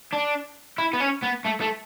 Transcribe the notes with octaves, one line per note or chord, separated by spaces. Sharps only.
D4
E4
B3
C#4
B3
A3
A3